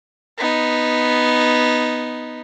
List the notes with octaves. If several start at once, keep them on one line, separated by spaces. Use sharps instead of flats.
B3 D#4